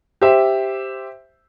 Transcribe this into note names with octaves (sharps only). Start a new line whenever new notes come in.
G4 C5 E5